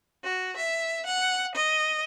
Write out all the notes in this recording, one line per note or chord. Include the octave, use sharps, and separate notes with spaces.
F#4
E5
F#5
D#5